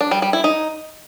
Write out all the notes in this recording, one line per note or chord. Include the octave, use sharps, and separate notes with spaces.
D4
G3
G3
E4
D#4